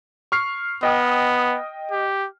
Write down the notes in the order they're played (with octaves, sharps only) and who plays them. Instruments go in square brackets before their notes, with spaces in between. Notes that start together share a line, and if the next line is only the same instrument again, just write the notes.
[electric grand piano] C#6 F6 C7
[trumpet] B3 [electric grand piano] D#5 G5 D#6
[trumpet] G4